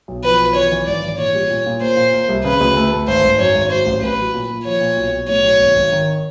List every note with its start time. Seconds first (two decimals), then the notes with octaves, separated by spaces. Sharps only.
0.08 B1
0.24 F3 B4
0.39 B1
0.55 E3 C#5
0.72 E3
0.87 G#1 D5
1.03 E3
1.18 A#2 C#5
1.35 G3
1.50 A#2
1.66 A#2
1.81 A#3 C5
1.97 A#2
2.14 A#3
2.29 C2
2.44 C#3 B4
2.61 D2
2.77 A3
2.93 A3
3.08 G#1 C5
3.24 G#1
3.39 F#2 C#5
3.55 G#1
3.70 F#3 C5
3.86 A1
4.02 A1 B4
4.18 F#3
4.34 A#2
4.50 A#2
4.65 F3 C#5
4.81 A#2
4.97 B1
5.12 B1
5.28 A2 C#5
5.44 B1
5.60 G#1
5.76 G#1
5.92 D#3